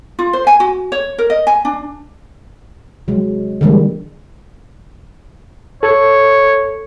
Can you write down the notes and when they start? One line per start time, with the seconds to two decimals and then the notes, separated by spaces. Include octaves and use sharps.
0.19 F4
0.33 C5
0.47 G#5
0.60 F#4
0.92 C#5
1.18 A#4
1.30 D#5
1.47 G#5
1.65 D4
3.08 C3 F#3 G#3
3.61 D3 E3 G3 G#3 A#3
5.83 A4 C#5